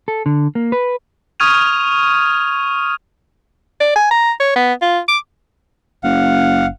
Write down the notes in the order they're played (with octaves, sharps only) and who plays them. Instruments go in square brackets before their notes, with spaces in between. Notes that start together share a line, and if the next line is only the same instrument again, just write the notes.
[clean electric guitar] A4
D3
A#3
B4
[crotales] C#6 D#6 F6 G#6 D#7 F7
[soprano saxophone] D5
G#5
A#5
C#5
B3
F4
D6
[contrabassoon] F#1 [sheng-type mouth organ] F5 F#5